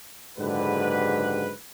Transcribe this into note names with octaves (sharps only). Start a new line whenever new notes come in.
F#1 G#2 D3 G4 B4